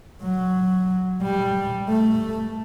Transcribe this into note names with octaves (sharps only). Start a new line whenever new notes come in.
F#3
G3
A3